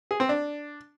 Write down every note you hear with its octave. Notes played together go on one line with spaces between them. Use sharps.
G#4
C4
D4